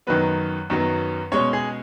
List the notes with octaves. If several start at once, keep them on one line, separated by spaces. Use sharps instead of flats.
F#2 D#3 F#3 B3 B4
F#2 D#3 F#3 B3
B2 G#3 C#4 C#5
G#4